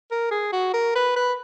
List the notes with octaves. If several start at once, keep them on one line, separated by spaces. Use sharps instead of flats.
A#4
G#4
F#4
A#4
B4
B4